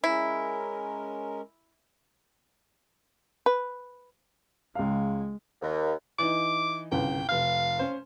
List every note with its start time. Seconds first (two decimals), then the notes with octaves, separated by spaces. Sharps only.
0.04 G#3 C#4 E4 A#4
3.46 B4
4.75 C#2 G#3 F5
5.62 D#2
6.19 E3 D#4 D6
6.92 G1 C2 C#3 G5
7.29 F1 F5 F6
7.79 C#4 C5